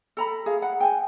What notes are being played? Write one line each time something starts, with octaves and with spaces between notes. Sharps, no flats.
A4 A#5 B5
G#4 F5
F#5
G5 G#5